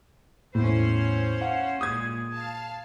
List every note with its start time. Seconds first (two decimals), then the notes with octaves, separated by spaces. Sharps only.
0.55 E2 A2 C#4 C5
1.41 F5 F#5
1.81 A#2 G#3 D#6 G#6
2.32 F5 A5